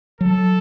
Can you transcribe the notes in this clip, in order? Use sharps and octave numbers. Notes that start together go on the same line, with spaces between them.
F#3 A4